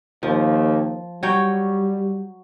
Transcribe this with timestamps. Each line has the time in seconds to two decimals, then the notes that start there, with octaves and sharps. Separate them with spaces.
0.23 D#2 F3
1.23 F#3 G3 C#5 G5